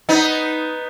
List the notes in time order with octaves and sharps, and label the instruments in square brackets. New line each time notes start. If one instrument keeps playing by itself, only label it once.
[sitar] B3 D#4